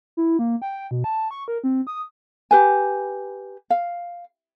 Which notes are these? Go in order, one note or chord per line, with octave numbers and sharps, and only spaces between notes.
E4
A#3
G5
B2
A5
C#6
A#4
C4
D#6
G4 B4 G#5
F5